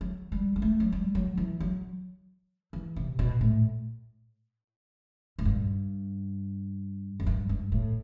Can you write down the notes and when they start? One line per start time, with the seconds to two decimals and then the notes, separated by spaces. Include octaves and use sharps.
0.01 F#3
0.32 G3
0.56 B3
0.62 A3
0.80 F#3
0.92 G3
1.15 F#3
1.37 E3
1.60 F#3
2.73 E3
2.96 C3
3.19 B2
3.41 A2
5.39 A2
5.45 G2
7.20 F#2
7.26 G2
7.49 G2
7.72 A2